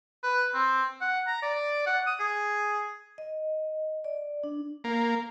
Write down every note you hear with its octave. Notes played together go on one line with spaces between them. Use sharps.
B4
C4
F#5
A#5
D5
F#5
D#6
G#4
D#5
D5
D4
A#3